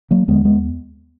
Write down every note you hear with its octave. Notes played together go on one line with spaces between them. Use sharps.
F#3 A#3
D#2 D3 G#3 B3
G#3 B3